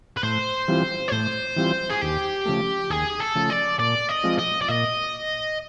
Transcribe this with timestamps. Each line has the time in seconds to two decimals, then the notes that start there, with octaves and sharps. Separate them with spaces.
0.17 B4
0.23 A2 C5
0.68 E3 G3 C4 F4
1.08 C#5
1.12 A2 C5
1.56 E3 G3 C4 F4
1.90 G#4
2.01 D#2 G4
2.45 C#3 F3 A3
2.90 D#2 G#4
3.20 A4
3.35 C#3 F3 A3
3.50 D5
3.79 A#2 D5
4.09 D#5
4.23 F3 G#3 C4 F4
4.39 D#5
4.61 D5
4.68 A#2 D#5